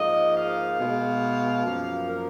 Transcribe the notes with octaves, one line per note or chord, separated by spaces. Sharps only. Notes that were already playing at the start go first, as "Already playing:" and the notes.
Already playing: G#2 F3 A#3 D#5
F5
B2 G#3
F#2 F3 A#3
A#4